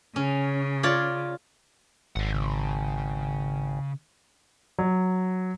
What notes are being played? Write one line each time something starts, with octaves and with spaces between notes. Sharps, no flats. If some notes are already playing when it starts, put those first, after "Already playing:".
C#3 C#4
F4 C#5 D5
G#1 D5 F#5
C#3
F#3